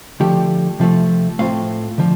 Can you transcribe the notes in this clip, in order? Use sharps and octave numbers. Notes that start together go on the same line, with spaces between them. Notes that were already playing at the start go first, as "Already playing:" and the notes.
D3 F3 A3 G4
C3 F3 A3
A2 A3 C4 F4 F5
D3 F3